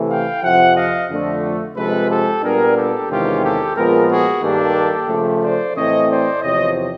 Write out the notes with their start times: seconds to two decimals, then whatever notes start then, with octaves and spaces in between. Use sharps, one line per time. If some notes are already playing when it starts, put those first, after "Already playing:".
Already playing: C3 E3 A3
0.09 F5 G5
0.43 F2 C3 F3 E5 F#5
0.76 D#5 F5
1.10 F2 D3 F3 A3 D4
1.76 C3 F3 G#3 C4 A4 B4
2.10 G4 A4
2.43 A#2 G3 B3 D4 G#4 A#4
2.76 G4 A4
3.09 E2 C3 D#3 G#3 C#4 F4 G4
3.42 G4 A4
3.75 A#2 F3 G#3 B3 G#4 A#4
4.09 F#4 G#4
4.42 G2 D#3 G3 A#3 D4 G4 A4
5.09 C#3 F3 A3
5.42 C5 D5
5.75 A2 E3 A3 C4 C#5 D#5
6.09 C5 D5
6.42 E2 C3 F3 C#5 D#5